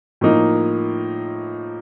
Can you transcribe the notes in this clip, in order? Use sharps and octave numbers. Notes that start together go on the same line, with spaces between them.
A2 F3 A#3 D#4